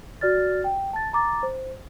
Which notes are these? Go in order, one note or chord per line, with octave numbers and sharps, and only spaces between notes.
F#4 D5 F6 A6
G5
A5 A6
A#5 D6 A6
C5